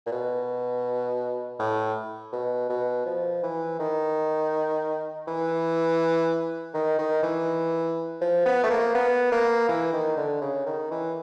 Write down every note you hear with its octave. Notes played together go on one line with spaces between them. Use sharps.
A#2
B2
A2
B2
B2
F3
E3
D#3
E3
D#3
D#3
E3
F3
B3
A3
A#3
B3
A#3
E3
D#3
D3
C#3
D#3
E3